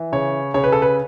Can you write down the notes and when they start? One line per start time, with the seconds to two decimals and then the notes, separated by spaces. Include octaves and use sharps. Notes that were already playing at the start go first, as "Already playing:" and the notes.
Already playing: E3
0.13 C#3 C#5
0.54 C#3 C#5
0.64 B4
0.72 A4
0.82 B4